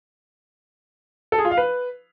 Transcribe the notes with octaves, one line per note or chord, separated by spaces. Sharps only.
A4
G#4
F4
F5
B4